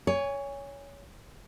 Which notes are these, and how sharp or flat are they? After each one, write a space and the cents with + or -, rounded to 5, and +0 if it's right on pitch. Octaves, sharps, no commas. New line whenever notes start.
C#5 +20 G#5 -20